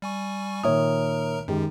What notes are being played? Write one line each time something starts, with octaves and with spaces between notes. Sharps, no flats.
G3 G#5 C#6
A#2 D#3 A#4 C#5 E5 A#5 D#6
F#2 D#3 G#3 G4